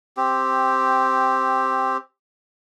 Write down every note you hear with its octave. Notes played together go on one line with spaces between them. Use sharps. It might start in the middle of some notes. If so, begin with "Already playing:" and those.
C4 G4